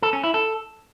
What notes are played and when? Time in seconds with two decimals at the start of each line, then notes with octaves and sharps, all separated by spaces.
0.02 A4
0.13 C#4
0.24 E4
0.34 A4